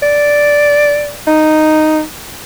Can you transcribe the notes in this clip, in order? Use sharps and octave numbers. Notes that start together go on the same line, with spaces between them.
D5
D#4